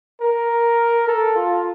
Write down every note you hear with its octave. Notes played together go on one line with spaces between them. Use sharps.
A#4
A4
F4